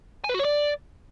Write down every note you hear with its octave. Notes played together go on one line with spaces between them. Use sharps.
G#5
B4
F#4
C#5
D5